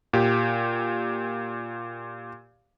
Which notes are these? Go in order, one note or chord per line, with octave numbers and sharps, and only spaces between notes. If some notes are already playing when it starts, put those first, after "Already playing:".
A#2 G4